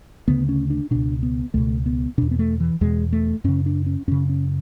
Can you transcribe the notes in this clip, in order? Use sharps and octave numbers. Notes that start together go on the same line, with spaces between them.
D2 C#3 B3
C#4
D4
C#2 B2 D4
B3
C#2 B2 A3
B3
E2 B2 D4
B3
A3
E3
E2 B2 G#3
A3
F#2 C#3 C#4
D4
C#4
F#2 C#3 C#4
C#4